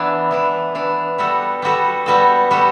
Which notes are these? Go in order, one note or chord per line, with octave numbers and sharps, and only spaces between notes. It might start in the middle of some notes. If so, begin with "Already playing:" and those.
Already playing: E3 B3 D4
E3 B3 D4
E3 B3 D4
G3 B3 F#4 A4
G3 B3 F#4 A4
G3 B3 F#4 A4
G3 B3 F#4 A4